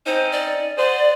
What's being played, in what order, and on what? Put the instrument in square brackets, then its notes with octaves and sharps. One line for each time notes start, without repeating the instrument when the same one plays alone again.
[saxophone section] C4 C#4 D#4 [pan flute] C5
[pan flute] D5
[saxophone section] F#4 G#4 C5 [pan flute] D5